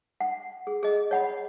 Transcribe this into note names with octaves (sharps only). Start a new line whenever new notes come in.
F#5
G#4
G#4 D#5
C#5 F#5 B5